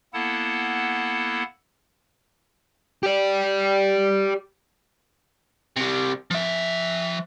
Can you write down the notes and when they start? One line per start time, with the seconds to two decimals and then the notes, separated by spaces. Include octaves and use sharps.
0.14 A#3 B3 E4 A4 F#5 A5
3.03 G4 D5
5.76 C3 G3
6.31 F3 E5